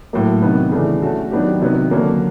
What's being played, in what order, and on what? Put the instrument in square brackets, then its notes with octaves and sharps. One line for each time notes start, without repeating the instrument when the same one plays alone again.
[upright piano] A2 F#3 A#3
C3 D#3 F#3 B3
C#3 E3 A3 D4
A3 C#4 F#4 A4
D#3 F#3 B3 D4 G4
C3 D#3 F#3 B3
D3 F#3 A#3 C#4